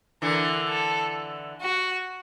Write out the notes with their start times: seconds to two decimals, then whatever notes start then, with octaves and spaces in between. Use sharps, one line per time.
0.22 D3 E3 A#4
0.69 A4
1.61 F#4